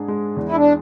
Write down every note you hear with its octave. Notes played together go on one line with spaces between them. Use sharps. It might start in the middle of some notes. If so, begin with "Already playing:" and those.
Already playing: G#2 D4 G#4
G#3
E2
E4
D4